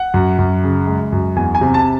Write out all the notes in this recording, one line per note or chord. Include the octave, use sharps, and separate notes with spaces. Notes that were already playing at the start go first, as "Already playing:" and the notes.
Already playing: F#5
F#2
F#2
C#3
G#3
F#2
E2 G#5
G#5
C3
A5